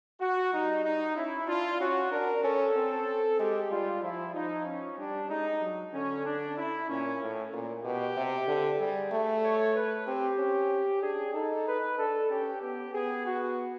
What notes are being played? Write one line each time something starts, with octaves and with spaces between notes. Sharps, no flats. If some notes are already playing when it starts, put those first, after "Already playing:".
F#4
G3 D#4
D#4
C#4 E4
D4 F4
C#4 F#4
D4 A#4
C#4 A4
C4
G#3 G4
G3 F4
F3 E4
F3 D#4
C#4
G3 D4
G#3 D#4
F#3
D3 C#4
D4
E4
A#2 C#4
A2
A#2
B2 G4
C3
D3
G3 G#4
A3
C#5
B4
C4 G4
C#4
D4 G#4
D#4 A4
B4
D4 A4
C#4 G4
B3 G4
B3 G#4
F#4